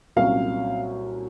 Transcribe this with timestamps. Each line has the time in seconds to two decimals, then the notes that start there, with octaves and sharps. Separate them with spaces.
0.16 C2 A#2 F#3 C#4 F5